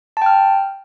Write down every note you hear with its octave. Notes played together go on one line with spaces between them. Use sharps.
G5 A5 F6